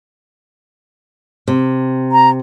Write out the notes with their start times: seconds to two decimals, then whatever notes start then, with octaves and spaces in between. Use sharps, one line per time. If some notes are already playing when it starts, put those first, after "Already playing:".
1.48 C3
2.12 A#5